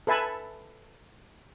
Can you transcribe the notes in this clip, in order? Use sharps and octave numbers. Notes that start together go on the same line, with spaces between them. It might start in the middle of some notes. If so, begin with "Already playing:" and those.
A4 B4 E5 G#5 A5 B5